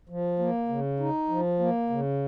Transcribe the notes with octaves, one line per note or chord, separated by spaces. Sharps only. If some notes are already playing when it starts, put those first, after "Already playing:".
F3
A#3
C#3
D#4
F3
A#3
C#3